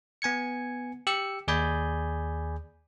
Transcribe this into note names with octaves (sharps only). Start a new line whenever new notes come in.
B3 G#5 G#6 C#7
G4 E6 C#7
D#2 G#4 D5 G#5 B5 G6